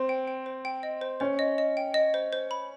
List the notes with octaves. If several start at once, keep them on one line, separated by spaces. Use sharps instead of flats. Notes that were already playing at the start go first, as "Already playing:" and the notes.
Already playing: C4 C5
G5
G5
C5
G5
D#5
C5
C#4 C5
D#5
D#5
G5
D#5
C5
C5
B5